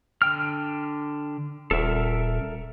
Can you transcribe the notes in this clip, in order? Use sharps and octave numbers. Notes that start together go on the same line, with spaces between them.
D3 G5 F6
D#1 A4 A#4 E5